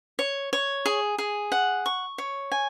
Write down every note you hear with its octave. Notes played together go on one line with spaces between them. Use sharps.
C#5
C#5
G#4
G#4
F#5
C#6
C#5
G#5